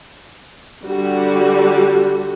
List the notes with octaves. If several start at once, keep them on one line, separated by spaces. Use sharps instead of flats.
D3 G3 F#4